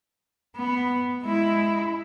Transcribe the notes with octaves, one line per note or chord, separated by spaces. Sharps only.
B3
G#3 E4